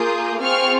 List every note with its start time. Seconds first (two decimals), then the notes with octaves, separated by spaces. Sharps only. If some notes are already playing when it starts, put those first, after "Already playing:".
Already playing: A#3 F4 G#4 D#6 G6
0.41 C4 F4 G#4 C#6 F6